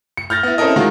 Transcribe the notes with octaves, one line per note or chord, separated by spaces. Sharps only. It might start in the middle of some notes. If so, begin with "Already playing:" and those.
C#7
F6 G6 A6 A#6
B3 E4
C4 C#4 E4 A4 A#4 D#5
D#3 F#3 G#3 F4 F#4 A#4